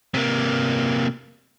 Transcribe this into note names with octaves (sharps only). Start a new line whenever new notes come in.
C3 A#3